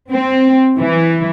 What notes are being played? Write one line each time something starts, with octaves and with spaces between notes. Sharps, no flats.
C4
E3